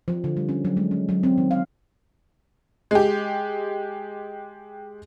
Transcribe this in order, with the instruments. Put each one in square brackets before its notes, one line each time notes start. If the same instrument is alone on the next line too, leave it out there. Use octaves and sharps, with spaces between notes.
[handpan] F3
D3
G3
C#4
F#3
G#3
C#4
F#3
C4
D#3
F5
[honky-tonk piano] G#3 G4